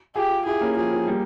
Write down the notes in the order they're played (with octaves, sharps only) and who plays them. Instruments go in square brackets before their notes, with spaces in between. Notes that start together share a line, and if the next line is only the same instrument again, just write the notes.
[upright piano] F4 G#4 [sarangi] G4
[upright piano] F4 G#4
[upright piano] E4 G4 [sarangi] G#4
[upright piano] A#3 C#4
[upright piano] F3 [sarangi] G#4
[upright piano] F3
G3 A#3